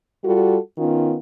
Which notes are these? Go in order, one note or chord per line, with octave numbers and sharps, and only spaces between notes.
G3 F4 F#4 A4
D#3 B3 C#4 F4